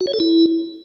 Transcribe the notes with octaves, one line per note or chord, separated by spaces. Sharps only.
F#4
C#5
A4
E4